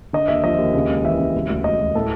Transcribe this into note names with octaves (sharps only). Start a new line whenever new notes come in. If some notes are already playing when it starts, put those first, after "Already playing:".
D3 D#5
D#2 E5
F3 D#5
D#2
C#3
C#2
E3 E5
C#3
E1
D2
E1 D#5
D2
A2 A4